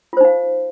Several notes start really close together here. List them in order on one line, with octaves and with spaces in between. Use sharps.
F4 C5 D#4 F5